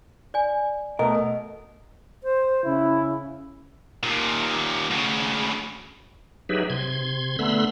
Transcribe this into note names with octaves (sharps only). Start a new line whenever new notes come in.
D5 G#5
B2 A3 A#4 D#5
C5
C#3 E4
D#2 A#2
D2 C#3
F#3 D#4 G4 G#4 B4 E5
C3 C6 G#6
D3 A3 B3 B5 C6 E6